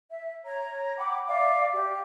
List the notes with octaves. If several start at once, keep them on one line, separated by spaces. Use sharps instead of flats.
E5
C#5 A#5
F#5 G5 B5 D6
D5 E5 F5 D6
G4